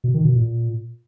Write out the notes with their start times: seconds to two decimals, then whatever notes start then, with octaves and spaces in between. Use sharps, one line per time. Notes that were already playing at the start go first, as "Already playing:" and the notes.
0.04 B2
0.14 D#3
0.25 B2
0.35 A#2